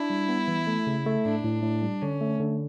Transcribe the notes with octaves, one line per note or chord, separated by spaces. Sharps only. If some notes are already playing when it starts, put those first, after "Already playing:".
Already playing: D4 E4
G3
B3
E3
A3
C#3
A3
A2 D4
A2
A2
G3
D3 C#4
A3
D3